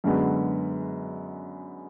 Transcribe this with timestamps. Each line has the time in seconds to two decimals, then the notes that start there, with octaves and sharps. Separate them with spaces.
0.04 F#2 D3 G#3 B3